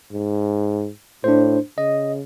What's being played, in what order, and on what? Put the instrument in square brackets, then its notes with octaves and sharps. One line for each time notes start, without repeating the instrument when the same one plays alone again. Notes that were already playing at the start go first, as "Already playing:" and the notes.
[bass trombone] G#2
[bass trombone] A2 [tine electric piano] D4 C5
[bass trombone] C#3 [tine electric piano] D#5